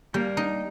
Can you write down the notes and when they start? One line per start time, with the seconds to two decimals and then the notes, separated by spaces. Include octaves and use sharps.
0.14 G3 A#3
0.37 D#4